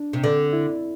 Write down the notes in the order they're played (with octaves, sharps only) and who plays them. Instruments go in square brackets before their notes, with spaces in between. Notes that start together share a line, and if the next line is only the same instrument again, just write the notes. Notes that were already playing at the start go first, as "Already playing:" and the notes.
Already playing: [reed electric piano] D4
[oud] C3
D3
[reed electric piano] E4